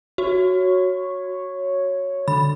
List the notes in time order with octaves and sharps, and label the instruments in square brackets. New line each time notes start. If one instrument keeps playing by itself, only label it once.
[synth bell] F#4 [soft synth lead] C#5
[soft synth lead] D3 [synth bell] B5